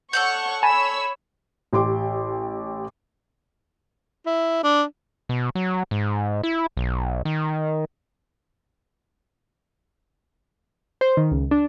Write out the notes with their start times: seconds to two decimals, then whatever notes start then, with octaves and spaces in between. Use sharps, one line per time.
0.13 A4 C#5 D5 F#5 C#6 G6
0.63 C#5 G#5 A5 B5 E6
1.73 A1 G4 C6 D6
4.26 E4
4.63 D4
5.29 B2
5.55 F#3
5.91 G#2
6.43 E4
6.77 B1
7.25 D#3
11.01 C5
11.17 D#3
11.32 C#2
11.51 D4